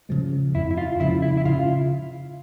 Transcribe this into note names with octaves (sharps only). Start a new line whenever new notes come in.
C#3 F3 G#3
F2 E4
E4
F4
C#3 F3 G#3 E4
E4
E4
C#3 F4